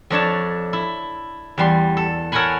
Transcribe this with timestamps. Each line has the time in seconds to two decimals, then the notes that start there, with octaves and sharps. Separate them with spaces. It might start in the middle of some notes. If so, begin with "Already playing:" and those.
0.10 F2 D4 C#5 A5
0.73 E4
1.58 E2 G3 C6
1.97 A4
2.32 A4 A#4 C#5 F#5 G#5 B5